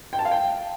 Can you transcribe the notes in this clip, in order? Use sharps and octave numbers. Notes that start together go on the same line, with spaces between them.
G5
A5
F5
G5